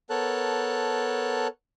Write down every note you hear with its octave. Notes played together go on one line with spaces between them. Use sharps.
B3 A4 A#4 C#5 A5 F#6